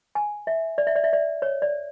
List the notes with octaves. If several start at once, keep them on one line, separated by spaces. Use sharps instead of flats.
G#5
E5
D5
E5
D5
E5
D5
C#5
D5